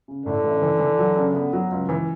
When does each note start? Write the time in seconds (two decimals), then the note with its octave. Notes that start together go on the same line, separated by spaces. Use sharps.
0.08 C#3
0.26 A2 D3
0.43 A1
0.62 E3
0.80 E3
0.98 F#3
1.16 C#3
1.34 B3
1.53 F#3
1.71 C#2
1.89 E3